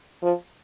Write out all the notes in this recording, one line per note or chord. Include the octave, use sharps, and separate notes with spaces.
F3